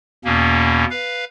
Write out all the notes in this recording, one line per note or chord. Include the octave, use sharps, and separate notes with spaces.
E2 B2 A#3 C#4
B4 F5